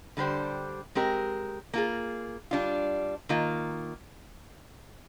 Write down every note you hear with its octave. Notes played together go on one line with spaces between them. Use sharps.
D3 G3 D4 G4 C5
G#3 C4 G4 A#4
A#3 F4 G#4
G3 D4 F4
D#3 A#3 F4